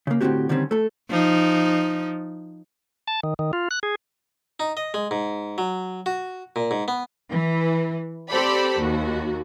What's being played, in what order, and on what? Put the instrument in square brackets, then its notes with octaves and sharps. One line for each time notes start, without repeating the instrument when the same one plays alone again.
[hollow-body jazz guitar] C#3 A#3
A2 D3 A#3 C4 F#4 G4
D3 D#3 G3 C4 C#4
A3 A4
[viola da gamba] F3 D#4
[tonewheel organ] A5
D#3
D#3
F4
F#6
G#4
[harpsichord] D#4
D#5
G#3
G#2
F#3
F#4
A#2
G#2
B3
[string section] E3
C4 G4 A4 C5 D5 B5
D#2 F#4